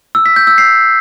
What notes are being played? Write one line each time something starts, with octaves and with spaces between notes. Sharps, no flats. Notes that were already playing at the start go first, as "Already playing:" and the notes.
E6
B6
G6
E6
C7